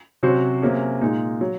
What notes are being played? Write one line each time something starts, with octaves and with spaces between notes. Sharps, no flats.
C3 F#3 C#4 F#4 C5
C3 F#3 A#3 C#4 G#4
A#2 G#3 D#4
F#3